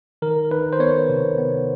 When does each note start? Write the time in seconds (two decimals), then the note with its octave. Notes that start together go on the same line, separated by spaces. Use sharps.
0.22 D#3 A#4
0.51 D#3 B4
0.73 C5
0.80 B3 C#5
1.09 C3
1.38 B3